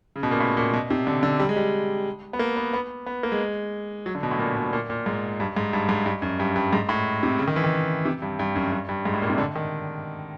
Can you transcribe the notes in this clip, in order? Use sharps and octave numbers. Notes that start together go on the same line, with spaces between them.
C#3
B2
A#2
A2
A#2
B2
C3
D3
D3
G3
G#3
G3
B3
A#3
B3
B3
B3
A#3
G#3
F#3
D3
B2
A2
A#2
B2
A#2
A#2
G#2
G2
G#2
G2
G#2
G2
F#2
G2
G2
G#2
A2
C3
C#3
D#3
E3
D#3
C3
G2
G2
F#2
G2
G2
G#2
A2
A#2
C3
D3
D#3